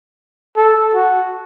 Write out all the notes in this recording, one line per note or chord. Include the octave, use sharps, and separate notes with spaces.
A4
F#4